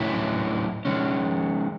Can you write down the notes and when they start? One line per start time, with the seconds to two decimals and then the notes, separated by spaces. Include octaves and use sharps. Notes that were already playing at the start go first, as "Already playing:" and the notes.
Already playing: A2 F#3 C#4 E4
0.85 D#3 G#3 C#4